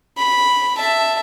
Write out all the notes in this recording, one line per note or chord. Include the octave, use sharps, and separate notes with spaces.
B5
E5 A5